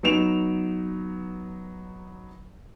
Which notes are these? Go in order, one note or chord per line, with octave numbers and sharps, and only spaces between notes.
F#3 B3 D#4 D7 E7 F7